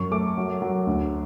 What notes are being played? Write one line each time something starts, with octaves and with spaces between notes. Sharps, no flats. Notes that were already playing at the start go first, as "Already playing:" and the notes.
Already playing: F#2 C#6
A3 D6
F#3
F#3
D2